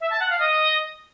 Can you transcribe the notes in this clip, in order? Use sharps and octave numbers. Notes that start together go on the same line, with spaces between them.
E5
A5
F#5
F5
D#5